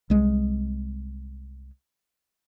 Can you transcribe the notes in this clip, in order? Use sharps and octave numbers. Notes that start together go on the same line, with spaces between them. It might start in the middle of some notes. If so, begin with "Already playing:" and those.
C2 G#3